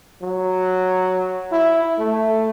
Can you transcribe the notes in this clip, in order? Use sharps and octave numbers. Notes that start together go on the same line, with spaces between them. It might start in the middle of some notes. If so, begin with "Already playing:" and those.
F#3
E4
A3